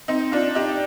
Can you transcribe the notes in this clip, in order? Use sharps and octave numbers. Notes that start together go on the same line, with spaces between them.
C4 D#4
D4 F4
D#4 G4